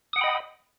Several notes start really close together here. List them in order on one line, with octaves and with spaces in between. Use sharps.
D#6 F#5 G5 B5 D#5